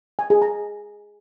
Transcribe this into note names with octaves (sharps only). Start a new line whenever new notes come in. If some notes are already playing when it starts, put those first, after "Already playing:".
G#5
G#4
A#5